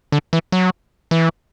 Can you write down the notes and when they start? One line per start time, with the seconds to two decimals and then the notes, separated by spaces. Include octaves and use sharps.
0.12 D3
0.33 E3
0.52 F#3
1.11 E3